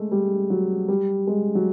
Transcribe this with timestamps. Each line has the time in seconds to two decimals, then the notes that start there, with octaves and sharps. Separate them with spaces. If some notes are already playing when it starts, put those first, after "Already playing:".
Already playing: G#3 A3
0.12 G3
0.50 F#3
0.88 G3
1.27 G#3
1.55 F#3